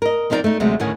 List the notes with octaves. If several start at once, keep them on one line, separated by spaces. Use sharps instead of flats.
A#4 D#5
F3 C4 D#4 F#4 A#4 D5
A3 D#4
D2 C3 F#3 G#3 A3
D2 A2 D#3 C#4 F#5 G#5